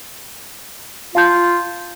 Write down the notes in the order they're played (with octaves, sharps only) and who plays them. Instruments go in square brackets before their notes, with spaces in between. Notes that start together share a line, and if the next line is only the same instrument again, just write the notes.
[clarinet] F4 [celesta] F5 A5 G6